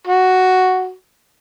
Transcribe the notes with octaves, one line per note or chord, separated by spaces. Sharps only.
F#4